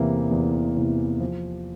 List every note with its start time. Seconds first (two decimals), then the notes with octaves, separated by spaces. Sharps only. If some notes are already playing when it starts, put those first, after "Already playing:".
Already playing: E2 C3 E3 A#3
0.31 E2
0.76 C3 E3 A#3
1.20 F3